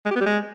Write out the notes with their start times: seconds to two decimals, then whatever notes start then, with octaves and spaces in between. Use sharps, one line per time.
0.06 G#3
0.11 G4
0.16 B3
0.21 G3
0.26 G#3